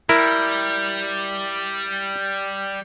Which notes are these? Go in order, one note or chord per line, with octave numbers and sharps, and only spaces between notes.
G3 E4 A#4